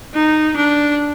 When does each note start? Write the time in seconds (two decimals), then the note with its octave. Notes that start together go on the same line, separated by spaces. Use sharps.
0.14 D#4
0.56 D4